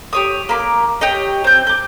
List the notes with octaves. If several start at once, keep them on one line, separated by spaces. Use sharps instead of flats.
G4 C#5 D#6
A#3 B5 D6
G4 C#5 D#5
C4 G6
D6 G6